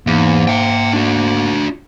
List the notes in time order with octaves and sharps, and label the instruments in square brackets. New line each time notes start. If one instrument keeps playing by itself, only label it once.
[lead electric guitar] E2 [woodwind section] G#2 A#3
[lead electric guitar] E5 G5
D4 F#4